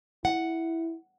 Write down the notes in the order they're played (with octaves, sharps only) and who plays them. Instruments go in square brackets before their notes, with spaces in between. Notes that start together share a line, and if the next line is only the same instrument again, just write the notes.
[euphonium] E4 [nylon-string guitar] F#5